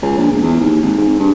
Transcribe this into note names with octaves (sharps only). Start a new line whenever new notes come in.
C#2
A#1
E1
E2
D#2
G#1
G#2
G2